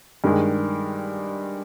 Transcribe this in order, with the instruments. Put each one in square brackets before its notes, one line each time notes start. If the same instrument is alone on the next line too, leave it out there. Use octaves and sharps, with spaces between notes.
[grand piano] G2 D#3 G#3